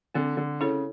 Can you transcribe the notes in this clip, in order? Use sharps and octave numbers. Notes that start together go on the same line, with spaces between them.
D3 C4
D3
C#3 E4 A4 C#5